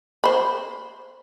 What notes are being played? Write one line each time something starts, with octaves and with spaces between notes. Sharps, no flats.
C5 B5